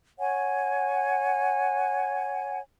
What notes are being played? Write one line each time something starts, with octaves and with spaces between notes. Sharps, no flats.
C#5 F#5 G#5